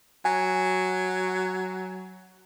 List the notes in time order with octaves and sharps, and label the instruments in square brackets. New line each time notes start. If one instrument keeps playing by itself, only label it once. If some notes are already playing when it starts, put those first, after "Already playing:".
[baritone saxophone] F#3 [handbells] G#5